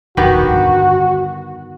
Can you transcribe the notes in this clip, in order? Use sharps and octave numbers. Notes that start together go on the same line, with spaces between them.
D#1 B1 F2 D#3 B3 F#4 G4
G2 D3